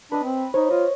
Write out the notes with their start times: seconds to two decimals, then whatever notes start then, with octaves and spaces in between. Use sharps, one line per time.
0.12 D4 B4 D#5
0.23 C4
0.54 D#4 C5 C#5
0.71 F4 D#5